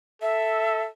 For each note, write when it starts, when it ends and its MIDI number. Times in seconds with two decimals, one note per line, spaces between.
0.22 0.89 69
0.22 0.83 76